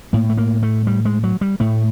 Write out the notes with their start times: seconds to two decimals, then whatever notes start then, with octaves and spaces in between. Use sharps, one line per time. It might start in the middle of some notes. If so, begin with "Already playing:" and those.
0.13 A2 A#3
0.30 A3
0.38 A#3
0.63 A3
0.87 G3
1.05 G#3
1.24 F#3
1.41 G3
1.60 A2 A3